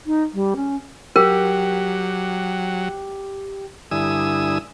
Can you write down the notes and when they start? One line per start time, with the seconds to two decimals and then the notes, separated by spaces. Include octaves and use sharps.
0.07 D#4
0.34 G3
0.56 C#4
1.16 F#3 G4 A#4
3.91 G2 D3 E4 G#5 D#6 E6